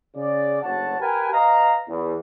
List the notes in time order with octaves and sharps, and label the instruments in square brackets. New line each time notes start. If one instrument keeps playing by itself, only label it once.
[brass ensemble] C#3 D5
F#1 D2 C#5 F#5 A5
G4 A#4 B4 G5 G#5
B4 D#5 F5 A#5
E2